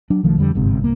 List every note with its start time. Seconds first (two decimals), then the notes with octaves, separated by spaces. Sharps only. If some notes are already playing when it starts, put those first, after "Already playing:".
0.10 F#3 D4
0.23 B1 D#3 F3 A3
0.38 F2 D3 G3
0.55 G1 G#2 C3
0.80 C2 A#3